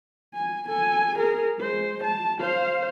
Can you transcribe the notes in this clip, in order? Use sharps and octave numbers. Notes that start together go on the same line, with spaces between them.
G#5
A4 G#5
G#4 A#4
G#3 C5
A5
C5 F5